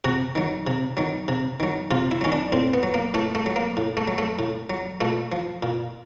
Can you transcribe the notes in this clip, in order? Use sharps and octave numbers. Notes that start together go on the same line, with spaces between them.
C3 F#4
D#3 F#3
C3
D#3 F#3
C3
D#3 F#3
C3 F4
E4
D#3 F#3 C#4
D4
A2 C4
B3
F#3
A#3
A2 A3
A3
F#3
A#3
A2
A3
F#3
A3
A2
F#3
A#2 A3
F3
A#2